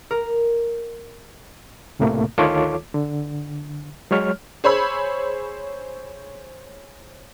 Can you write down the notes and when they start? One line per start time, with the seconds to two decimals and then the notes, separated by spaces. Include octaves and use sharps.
0.11 A#4
1.99 C#2 A2 C3 A3 A#3
2.38 D2 D#3 F4 A4 C#5 D6
2.94 D3
4.11 F#3 G#3 C#5 F6
4.64 G#4 C5 C#5 B5 E6